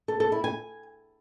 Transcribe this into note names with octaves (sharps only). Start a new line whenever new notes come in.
A4
A4
E4
G#5